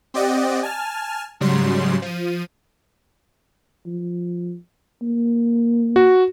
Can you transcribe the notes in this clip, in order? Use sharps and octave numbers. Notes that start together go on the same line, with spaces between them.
C4 G4 D5 D#5 F#5
G#5 A5 F6
G#2 C#3 F#3 G3 C6
F3 D#7
F3
A#3
F#4